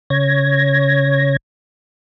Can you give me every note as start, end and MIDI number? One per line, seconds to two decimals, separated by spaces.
0.10 1.36 49
0.10 1.36 73
0.10 1.36 92
0.10 1.36 94